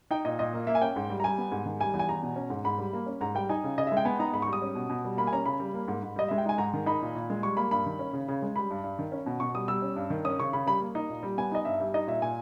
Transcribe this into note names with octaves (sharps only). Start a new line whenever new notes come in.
D#4 G5
A#2 D#5
A#2 D#5
A#3
A#3 E5
G#5
C#4 G5
G#2
G3
A#5
G3 G#5
B3
G#2
D#3
G3 G#5
E2
G#5
E2 A#5
B2
C#4
G#2
G#2 B5
G3
A#3
C#4
G#2 A#5
G3 G5
D#4 G#5
C#3
C#3 D#5
E5
G#3 G5
B3 G#5
D#4 A#5
G#2 B5
C#6
G3
D#6
C#4
B2
B2
G3
A#3 B5
G#5
C#4 A#5
C#3 B5
G3
A#3
G#2
G#2
G3 D#5
G#3 E5
G5
D#4 G#5
G#2 A#5
D#3
D#4 B5
A#2
A#2
G#3
G3 C#6
A#3 B5
G2 B5
D#3
C#4
C#3
C#3
G#3
G3 B5
G2
G2
D#3
C#4
B2
B2 C#6
G3 D#6
G3 E6
C#4
G2
D#3
C#4 D#6
C#3 C#6
C#3 B5
G3 B5
A#3
D#4
A#2
G3
B3 G#5
D#4 D#5
G2 E5
G3
D#4 D#5
A#2 E5
A#2 G#5